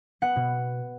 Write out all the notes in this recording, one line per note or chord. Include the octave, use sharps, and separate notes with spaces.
B3 F#5
B2